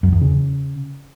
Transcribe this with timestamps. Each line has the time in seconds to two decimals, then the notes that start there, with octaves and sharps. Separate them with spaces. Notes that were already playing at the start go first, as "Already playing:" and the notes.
0.03 F#2
0.12 E2
0.22 C#3